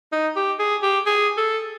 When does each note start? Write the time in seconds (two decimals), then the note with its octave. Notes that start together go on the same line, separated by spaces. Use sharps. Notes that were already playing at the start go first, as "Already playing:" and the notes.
0.12 D#4
0.36 G4
0.59 G#4
0.82 G4
1.06 G#4
1.38 A4